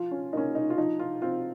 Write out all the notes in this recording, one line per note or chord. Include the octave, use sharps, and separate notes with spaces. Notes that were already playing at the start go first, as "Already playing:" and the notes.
Already playing: F3 F4
C#4
A#3 C#4 D#4
D#4
F4
F3 D#4
F4
C4 F4